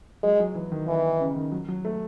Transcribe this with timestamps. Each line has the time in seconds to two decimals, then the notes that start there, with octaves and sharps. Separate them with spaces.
0.23 F#3 G#3
0.40 F#3
0.55 E3
0.72 D#3
0.87 D#3 E3
1.21 C#3
1.36 D#3
1.52 F#3
1.69 F#3
1.85 A3